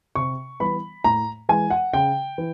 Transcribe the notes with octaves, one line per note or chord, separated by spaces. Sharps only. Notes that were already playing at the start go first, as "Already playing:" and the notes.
C3 C#6
E3 G3 B3 B5
A2 A#5
E3 G#3 G#5
F#5
C#3 G5
E3